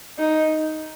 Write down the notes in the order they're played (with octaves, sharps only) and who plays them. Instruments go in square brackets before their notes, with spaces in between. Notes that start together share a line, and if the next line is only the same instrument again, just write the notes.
[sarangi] D#4